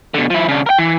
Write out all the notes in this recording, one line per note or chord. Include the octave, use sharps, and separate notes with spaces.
B2 D3
F3 E4
C#3 D4
A#4 G5
E3